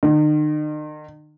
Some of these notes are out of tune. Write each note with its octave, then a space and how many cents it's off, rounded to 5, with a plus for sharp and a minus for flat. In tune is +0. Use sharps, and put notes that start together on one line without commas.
D#3 -45